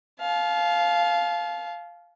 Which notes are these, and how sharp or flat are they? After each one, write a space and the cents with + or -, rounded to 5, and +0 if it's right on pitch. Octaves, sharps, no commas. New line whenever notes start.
F5 +0 A5 -35